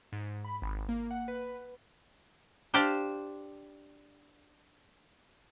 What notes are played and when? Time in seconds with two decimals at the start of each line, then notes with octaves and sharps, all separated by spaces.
0.13 G#2
0.45 B5
0.62 G#1
0.89 A#3
1.11 F#5
1.28 B4
2.74 D4 G4 C5 D5 F5